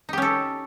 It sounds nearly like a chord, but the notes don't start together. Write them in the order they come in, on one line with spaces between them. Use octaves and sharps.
D#4 G4 C#4 A4